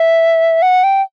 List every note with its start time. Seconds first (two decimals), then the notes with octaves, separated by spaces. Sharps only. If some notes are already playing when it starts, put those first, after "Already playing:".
Already playing: E5
0.62 F#5
0.84 G5